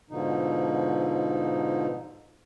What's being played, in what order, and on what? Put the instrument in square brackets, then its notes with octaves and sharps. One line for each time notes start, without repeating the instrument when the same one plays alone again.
[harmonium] G#2 B2 D3 F3 D#4